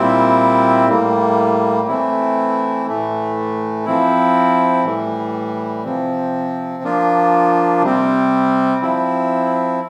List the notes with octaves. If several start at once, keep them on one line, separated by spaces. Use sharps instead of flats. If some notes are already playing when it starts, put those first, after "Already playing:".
Already playing: A#2 G3 C4 E4
A2 G3 A#3
E3 A3 C4 E4
A2 E3 A3
F3 C4 E4
A2 E3 G3
C3 F3 C4
F3 A#3 D4 F4
C3 G3 C4
F3 C4 E4